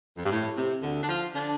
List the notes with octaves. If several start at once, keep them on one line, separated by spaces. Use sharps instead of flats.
F2
G2
A2
C3
D2 D3
D4
F3 F4
D3 D4